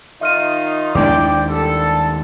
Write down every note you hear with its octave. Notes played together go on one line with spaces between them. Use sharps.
D#3 D#4 F4 E5 F6 D#7
D#2 G#3 D4 E4 D5 G5
G3 A4